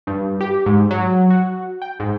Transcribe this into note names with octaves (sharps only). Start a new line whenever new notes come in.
G2
G4
G#2
F#3
F#4
G5
G#2